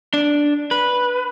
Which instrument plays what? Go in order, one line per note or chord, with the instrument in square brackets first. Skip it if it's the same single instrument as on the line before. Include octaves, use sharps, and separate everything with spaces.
[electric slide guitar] D4
B4